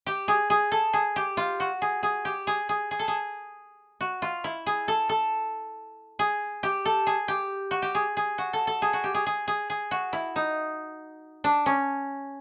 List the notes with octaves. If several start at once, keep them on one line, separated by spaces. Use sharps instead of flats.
G4
G#4
G#4
A4
G#4
G4
F4
F#4
G#4
G#4
G4
G#4
G#4
G#4
A4
G#4
F#4
F4
E4
G#4
A4
A4
G#4
G4
A4
G#4
G4
F#4
G4
G#4
G#4
F#4
A4
A4
G#4
F#4
G4
G#4
G#4
G#4
G#4
F#4
E4
D#4
D4
C#4